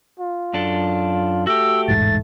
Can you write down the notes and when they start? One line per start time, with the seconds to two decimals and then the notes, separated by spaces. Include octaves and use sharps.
0.20 F4
0.53 F#2 D4 A4
1.47 A3 F#4 G4 E6
1.88 E1 A1 G#2 A6